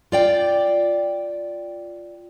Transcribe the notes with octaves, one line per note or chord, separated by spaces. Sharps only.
F4 D5 G5